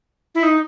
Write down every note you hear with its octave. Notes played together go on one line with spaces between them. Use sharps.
E4
D#4